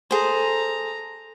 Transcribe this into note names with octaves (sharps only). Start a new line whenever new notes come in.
G#4 A4 C5 A#5